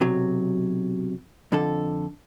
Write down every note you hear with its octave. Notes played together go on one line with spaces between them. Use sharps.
B1 C3 F#3
F2 D3 A4